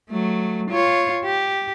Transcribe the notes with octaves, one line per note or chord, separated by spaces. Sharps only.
F#3 A3
F4 C#5
G4